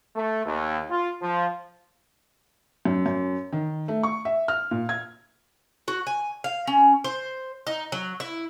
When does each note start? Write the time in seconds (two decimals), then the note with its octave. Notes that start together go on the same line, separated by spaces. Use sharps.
0.16 A3
0.45 D#2
0.90 F4
1.21 F3
2.85 F#2
3.06 F#2
3.52 D#3
3.88 A3
4.03 C#6
4.25 E5
4.48 F6
4.71 A#2
4.89 G#6
5.88 F#4
6.07 G#5
6.44 F5
6.67 C#4
7.04 C5
7.67 D#4
7.92 F#3
8.20 E4